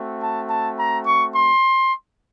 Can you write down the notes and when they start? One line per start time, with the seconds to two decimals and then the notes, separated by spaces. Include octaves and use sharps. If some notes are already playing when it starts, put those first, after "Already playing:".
Already playing: A3 C4 F#4
0.22 A5
0.50 A5
0.79 A#5
1.06 C#6
1.34 C6